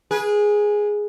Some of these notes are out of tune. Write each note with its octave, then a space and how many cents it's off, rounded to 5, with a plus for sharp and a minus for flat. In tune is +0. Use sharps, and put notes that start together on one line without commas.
G#4 +0 B4 -35